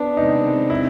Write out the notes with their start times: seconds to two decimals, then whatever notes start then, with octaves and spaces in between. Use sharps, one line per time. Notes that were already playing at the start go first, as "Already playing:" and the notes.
Already playing: B3 D4
0.17 C3 D#3 G#3 C4 D#4
0.70 E4